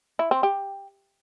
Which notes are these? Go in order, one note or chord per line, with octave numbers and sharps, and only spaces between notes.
E4
C4
G4